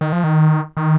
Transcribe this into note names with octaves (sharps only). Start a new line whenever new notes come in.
D#3
F3
D#3
D#3